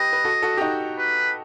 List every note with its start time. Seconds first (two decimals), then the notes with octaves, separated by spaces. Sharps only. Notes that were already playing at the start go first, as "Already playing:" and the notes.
Already playing: G4 B4 D#5
0.13 B4
0.25 F#4 A4
0.42 F#4 A4
0.57 G4
0.61 D#4 F#4
0.98 B4